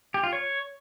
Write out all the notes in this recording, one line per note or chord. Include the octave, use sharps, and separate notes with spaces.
G4
F4
C#5